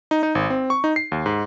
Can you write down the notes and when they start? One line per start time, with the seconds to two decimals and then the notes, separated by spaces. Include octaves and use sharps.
0.11 D#4
0.23 D#4
0.35 G#1
0.50 C4
0.70 C#6
0.84 D#4
0.96 C7
1.12 D#2
1.26 G#2